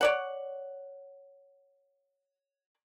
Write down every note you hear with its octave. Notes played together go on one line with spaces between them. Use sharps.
C#5 D5 F#5